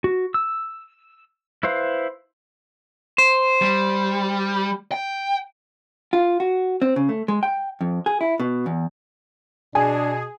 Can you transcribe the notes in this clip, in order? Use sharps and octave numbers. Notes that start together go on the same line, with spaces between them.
F#4
E6
E4 B4 C5 F5
C5
G3
G5
F4
F#4
C4
C#3
A3
G#3
G5
F2
G#4
E4
B2
E2
B2 D4 G#4 G#5